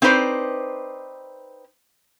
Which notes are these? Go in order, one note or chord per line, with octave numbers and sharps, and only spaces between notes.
C4 D#4 B4 C5 D5